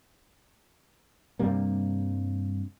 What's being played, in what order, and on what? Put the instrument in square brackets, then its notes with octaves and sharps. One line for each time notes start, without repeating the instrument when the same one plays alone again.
[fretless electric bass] G2 C3 G3 A#3